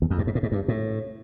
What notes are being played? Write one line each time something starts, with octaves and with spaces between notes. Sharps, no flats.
E2
F2
G2
G#2
A2
G#2
G2
A2